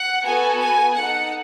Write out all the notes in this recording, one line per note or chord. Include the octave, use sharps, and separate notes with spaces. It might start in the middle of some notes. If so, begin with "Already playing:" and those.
Already playing: F#5
B3 F#4 A4 G#5
G#5
D#4 A4 F#5